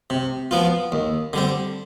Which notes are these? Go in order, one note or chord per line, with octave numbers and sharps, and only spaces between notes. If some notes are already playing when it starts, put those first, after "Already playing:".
C3
F3 B3 F4
D#2
D3 G3 C4